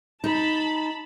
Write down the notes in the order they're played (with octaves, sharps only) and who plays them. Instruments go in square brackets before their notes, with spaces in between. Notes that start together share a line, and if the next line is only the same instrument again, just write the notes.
[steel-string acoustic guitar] D#4 [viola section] A5 B5